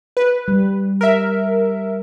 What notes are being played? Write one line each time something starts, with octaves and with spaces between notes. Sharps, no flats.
B4
G3
A#4 E5